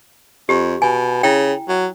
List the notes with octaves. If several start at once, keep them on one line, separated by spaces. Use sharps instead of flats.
F2 G4
B2 G#5
C#3 E4 G5
F#3